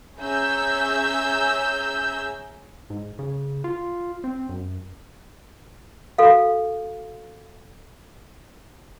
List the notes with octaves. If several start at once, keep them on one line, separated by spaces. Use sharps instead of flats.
C#4 G#4 E5 A#5 E6 G6
G#2
C#3
F4
C4
F#2
F#4 A4 F5